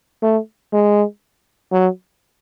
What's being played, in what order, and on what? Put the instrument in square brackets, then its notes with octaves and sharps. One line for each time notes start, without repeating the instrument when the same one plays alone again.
[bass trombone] A3
G#3
F#3